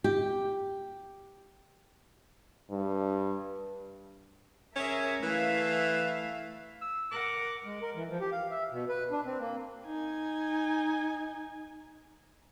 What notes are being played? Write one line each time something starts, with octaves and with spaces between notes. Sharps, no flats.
G4
G2
C#4 G#4 A#4 E5
E3 A3 E5 F5
E6
A#4 F#5 D6
G#3
A#4
E3
F3
G4
F5
E5
B2
B4
D4
C4
A#3
D#4 G#5